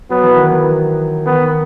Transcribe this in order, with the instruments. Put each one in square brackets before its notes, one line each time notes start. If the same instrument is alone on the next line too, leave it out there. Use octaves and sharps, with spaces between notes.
[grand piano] F#3 [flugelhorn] B3
[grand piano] E3
D#3
E3
[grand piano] D#3 [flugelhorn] B3